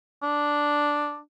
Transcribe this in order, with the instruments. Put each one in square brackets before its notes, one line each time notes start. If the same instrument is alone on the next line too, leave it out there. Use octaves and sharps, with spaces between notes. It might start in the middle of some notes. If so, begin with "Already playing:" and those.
[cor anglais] D4